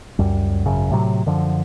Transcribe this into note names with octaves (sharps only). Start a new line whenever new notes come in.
C#2 F#2 G3
G#1 F#2 C#3
A2 C3 F#3
F#2 D3 F3